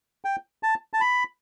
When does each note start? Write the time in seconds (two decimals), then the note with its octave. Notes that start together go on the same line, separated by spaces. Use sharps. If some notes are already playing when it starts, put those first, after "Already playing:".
0.25 G5
0.63 A5
0.93 A5
1.01 B5